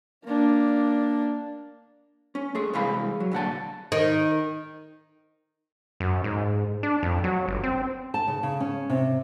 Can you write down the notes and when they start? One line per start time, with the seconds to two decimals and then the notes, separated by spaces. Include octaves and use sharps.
0.25 A#3 D4
2.35 C#4
2.55 A3 G#4
2.73 C2 E3 G#3 G#4 F5 B5
3.20 F#3
3.31 D2 A#2 F#5 A5
3.92 D#3
6.00 F#2
6.24 G#2
6.83 D4
7.03 F2
7.24 F#3
7.48 G1
7.64 C4
8.14 A5
8.28 C#3
8.43 C#3
8.60 C#4
8.90 C3